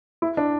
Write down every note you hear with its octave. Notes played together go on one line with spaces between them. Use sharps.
E4
D4